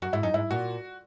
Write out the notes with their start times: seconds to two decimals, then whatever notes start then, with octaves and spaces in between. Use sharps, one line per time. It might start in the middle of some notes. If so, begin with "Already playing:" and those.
0.02 F#2 F#4
0.13 G#2 E4
0.23 F#2 D#4
0.34 G#2 E4
0.51 A#2 F#4